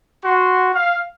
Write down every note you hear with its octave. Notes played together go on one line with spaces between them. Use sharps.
F#4 C6
F5